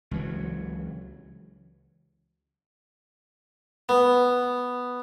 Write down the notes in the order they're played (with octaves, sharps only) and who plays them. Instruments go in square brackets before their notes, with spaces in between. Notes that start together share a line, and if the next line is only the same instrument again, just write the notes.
[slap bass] C#2 E3 F#3
[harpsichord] B3